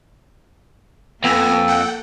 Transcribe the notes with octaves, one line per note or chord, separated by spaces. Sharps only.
F2 A#3 B3 A4 G#5 E6 A#6
F#5 G5